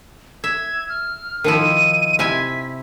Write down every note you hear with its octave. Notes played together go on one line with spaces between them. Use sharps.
E5 G#6
F6
D#3 F3 E4 D#7
C3 E4 G#5 B6